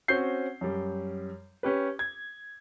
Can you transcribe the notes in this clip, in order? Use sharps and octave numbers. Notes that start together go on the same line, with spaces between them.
C4 C#4 F#4 G6 C7
F#2 G3
C#4 G4 B4
G#6